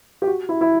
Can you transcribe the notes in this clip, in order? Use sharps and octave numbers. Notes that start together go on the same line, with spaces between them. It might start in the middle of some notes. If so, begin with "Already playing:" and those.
G4
F#4
E4
E4